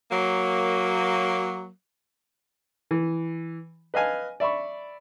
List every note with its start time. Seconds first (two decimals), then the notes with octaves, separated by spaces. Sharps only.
0.11 F#3 A#3
2.91 E3
3.94 B4 D#5 F5 G#5
4.40 D5 E5 B5 C#6